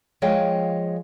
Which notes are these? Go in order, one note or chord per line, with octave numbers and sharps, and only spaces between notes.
F3 G#3 C#5 D#5 F5 G5